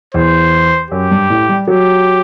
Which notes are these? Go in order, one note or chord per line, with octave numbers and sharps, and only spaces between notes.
E2 C5
F#2 G4
G2
A2
G3
F#3 G4